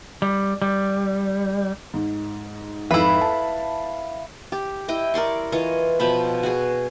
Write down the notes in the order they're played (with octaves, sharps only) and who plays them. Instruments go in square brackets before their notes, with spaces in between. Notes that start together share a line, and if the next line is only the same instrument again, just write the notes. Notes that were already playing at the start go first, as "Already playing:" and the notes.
[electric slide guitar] G3
G3
[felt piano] G#2
[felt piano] F2 G#2 [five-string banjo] E4 B4 [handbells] E5 F5 B5
[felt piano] A5
[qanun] G4
E4 D#5 G5
A#4 D5 C6 C#6
E3 F4 C#5 D#5
B2 F3 G5 B5
F#4 G#4